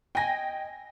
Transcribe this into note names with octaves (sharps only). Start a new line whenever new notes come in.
D#5 G5 G#5 A#6